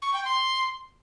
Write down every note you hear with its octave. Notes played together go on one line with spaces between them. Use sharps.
C#6
G5
C6